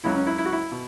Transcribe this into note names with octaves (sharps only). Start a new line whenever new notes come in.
C#2 C#3 F#3 E4
C#4
E4
E4
F#4
E4
B2